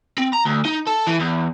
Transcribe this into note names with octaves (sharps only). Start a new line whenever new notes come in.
C4
A#5
D2
D#4
A4
E3
E2